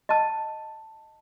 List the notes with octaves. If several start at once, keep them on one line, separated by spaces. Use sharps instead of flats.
D#5 A5